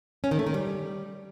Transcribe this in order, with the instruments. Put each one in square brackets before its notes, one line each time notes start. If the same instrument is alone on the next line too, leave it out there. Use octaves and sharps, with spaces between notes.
[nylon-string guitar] C#4
D#3
A3
D#3
G3